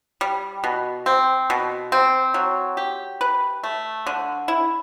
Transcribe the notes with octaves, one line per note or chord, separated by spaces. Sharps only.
G3
B2
C4
B2
C4
F#3
G4
B4
A3
D3
E4